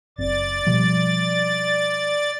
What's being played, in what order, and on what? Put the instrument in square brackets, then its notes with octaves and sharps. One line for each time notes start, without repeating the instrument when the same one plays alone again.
[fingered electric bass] F#1 C4 [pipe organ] D5 A6
[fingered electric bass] B2 F3 G3